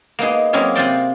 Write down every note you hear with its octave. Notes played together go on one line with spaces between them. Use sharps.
A#3 B3 D#4 G#4
F#3 A#3 C4 C#4 E4 G#4
C3 F4 C5 D5